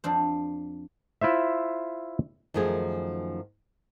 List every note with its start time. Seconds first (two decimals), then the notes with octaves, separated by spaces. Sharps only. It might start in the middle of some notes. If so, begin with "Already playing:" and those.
0.04 F2 D4 C5
1.21 E4 F4 C5 E5
2.54 F#2 D#3 F3 A3 G#4